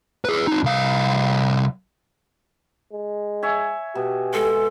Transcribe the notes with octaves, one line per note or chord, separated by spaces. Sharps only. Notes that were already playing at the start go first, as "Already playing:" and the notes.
G#4 B4
C4 D#4
C2 F5
G#3
C#5 E5 G#5
B2 G4
G#3 A4